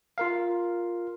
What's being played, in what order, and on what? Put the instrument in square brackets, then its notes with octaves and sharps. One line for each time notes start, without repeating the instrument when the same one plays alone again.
[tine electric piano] F4 A#4 F5